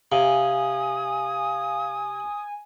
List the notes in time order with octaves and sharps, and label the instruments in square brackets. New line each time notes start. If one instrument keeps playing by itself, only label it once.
[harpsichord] C3 [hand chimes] F5 [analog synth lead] G#5 [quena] D#6